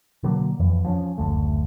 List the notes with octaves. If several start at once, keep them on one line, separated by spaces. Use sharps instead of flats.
B2 D3 F#3 A#3
F2 E3
F3 C4 C#4
F#1 D2 A3